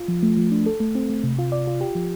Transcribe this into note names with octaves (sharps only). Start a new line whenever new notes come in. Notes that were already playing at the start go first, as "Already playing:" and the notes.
Already playing: F4
F3
A3
F3
D4
A4
A3
C4
A3
C3
F4
D5
F4
G4
F3